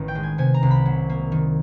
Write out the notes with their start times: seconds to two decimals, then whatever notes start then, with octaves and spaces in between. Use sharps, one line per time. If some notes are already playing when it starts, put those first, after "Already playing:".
Already playing: A1 D#3 B3
0.08 G5
0.15 G#3
0.23 G#5
0.38 C3 G#5
0.54 A#5
0.63 C2
0.71 B5
0.86 F#3
1.09 A#3
1.32 D#3